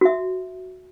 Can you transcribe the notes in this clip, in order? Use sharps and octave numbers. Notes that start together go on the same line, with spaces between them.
F#4 E5